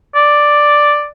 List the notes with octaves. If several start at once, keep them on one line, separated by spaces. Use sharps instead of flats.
D5